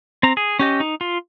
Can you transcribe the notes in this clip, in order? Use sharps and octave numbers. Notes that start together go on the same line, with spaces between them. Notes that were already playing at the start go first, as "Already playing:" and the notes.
C4 A#5
G#4
C#4 G4 D#5
D#4
F4